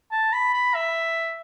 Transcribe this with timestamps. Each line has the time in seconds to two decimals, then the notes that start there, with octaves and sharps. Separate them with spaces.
0.12 A5
0.33 B5
0.54 B5
0.75 E5